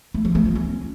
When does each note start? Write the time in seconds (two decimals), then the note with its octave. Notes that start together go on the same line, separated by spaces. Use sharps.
0.14 A3
0.25 F3
0.35 A3
0.45 F4
0.56 C#4